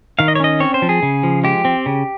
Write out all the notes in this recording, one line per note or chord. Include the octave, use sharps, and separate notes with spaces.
D#3 F5
D#5
C#5
C#4 D#5
C4 C#5
C5
F3
G#4
C#3
F3
G#3 G4
C4
C#3